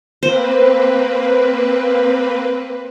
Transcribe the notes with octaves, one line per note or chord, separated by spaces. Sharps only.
A#3 C4 B4 C5